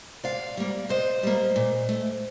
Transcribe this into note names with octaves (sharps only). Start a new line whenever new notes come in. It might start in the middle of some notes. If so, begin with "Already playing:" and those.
C3 D5 F5
G3 A#3
C3 C5 D#5
G3 A#3
A#2
A3